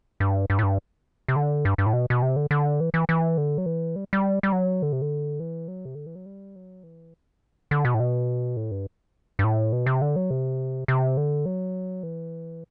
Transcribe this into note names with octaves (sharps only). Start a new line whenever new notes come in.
G2
G2
A2
G2
C3
D3
G2
G2
A2
B2
B2
C3
D3
D3
E3
E3
E3
D3
F#3
E3
G3
G3
G3
F#3
D3
C3
D3
E3
F#3
C3
D3
E3
F#3
G3
F#3
E3
D3
B2
A2
B2
A2
G2
G2
A2
B2
C3
D3
F#3
C3
C3
D3
F#3
E3